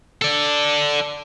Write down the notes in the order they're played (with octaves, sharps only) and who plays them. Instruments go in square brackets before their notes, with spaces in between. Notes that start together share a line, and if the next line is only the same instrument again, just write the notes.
[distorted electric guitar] A4 D5